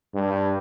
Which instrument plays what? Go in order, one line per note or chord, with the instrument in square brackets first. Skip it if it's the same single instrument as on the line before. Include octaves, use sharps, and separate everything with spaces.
[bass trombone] G2